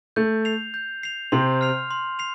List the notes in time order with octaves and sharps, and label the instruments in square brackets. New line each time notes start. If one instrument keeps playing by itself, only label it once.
[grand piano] A3 [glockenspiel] G6
[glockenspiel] C7 F7
G6
C7 F7
[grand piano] C3 C4 [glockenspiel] C6
[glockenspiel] F6 C7 F7
C6
C7 F7